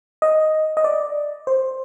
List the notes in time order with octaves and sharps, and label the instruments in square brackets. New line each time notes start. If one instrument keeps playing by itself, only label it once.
[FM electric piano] D#5
D#5
D5
C5